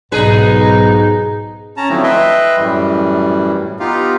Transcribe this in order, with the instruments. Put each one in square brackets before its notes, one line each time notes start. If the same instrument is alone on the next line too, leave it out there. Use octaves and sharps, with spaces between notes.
[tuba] B1 [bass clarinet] G#2 [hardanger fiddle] D#4 [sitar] G#4 B4
[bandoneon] C#4 A5 A#5
D3 F3 F#3 A3 C4 E4
B4 D#5 E5 G5 C6
F#2 A2 E3 G3
B3 D#4 F4 G4 F5